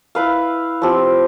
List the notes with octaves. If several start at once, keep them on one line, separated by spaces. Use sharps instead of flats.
E4 B4 F5
F3 C4 G4